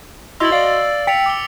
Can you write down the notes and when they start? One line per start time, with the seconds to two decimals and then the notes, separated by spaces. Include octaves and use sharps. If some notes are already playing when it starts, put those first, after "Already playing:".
0.40 E4 F#4 D#5 C6 E6 A6 F#7
0.52 D5 F5
1.07 G5 B6 C#7 F7
1.26 D6 G7